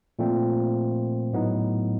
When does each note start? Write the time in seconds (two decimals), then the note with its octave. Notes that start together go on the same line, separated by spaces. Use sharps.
0.19 A#2 F3 A3 C4
1.33 A2 F#3 B3 D#4